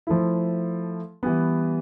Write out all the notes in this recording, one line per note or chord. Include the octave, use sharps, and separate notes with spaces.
F3 A3 E4
E3 G3 B3